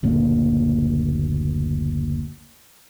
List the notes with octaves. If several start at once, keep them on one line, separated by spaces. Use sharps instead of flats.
F#1 D2 A#2 A#3